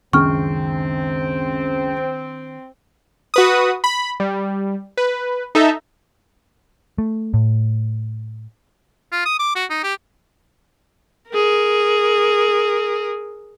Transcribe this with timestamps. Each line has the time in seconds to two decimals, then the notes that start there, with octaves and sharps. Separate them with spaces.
0.13 C#2 F#2 D#3 C4 D4 G5 C#6 F6
3.34 F#4 B4 D#6
3.84 B5
4.20 G3
4.97 B4
5.55 D#4 A4 E5
6.98 A3
7.34 A2
9.12 F4
9.26 D#6
9.39 D6
9.56 F#4
9.70 D#4
9.84 G4
11.30 G#4 A#4